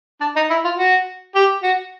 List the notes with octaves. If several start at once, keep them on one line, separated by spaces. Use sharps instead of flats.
D4
D#4
E4
F4
F#4
G4
F#4